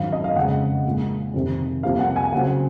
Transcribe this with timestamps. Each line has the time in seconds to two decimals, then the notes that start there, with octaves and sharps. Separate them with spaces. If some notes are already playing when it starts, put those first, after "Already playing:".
Already playing: G#1 F#2 D#3 F#3 C4 F5
0.12 D#5
0.24 F5
0.36 F2 C#3 G#3 C4 F#5
0.85 A#1 A#2 G#3
1.34 F2 C3 D#3
1.83 C2 C3 F3 A#3 F5
1.99 F#5
2.16 G#5
2.32 D#2 C#3 F#3 C4 F#5